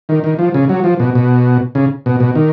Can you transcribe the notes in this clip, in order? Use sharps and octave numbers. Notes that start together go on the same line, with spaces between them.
D#3
D#3
F3
C#3
F#3
F3
B2
B2
C#3
B2
B2
D#3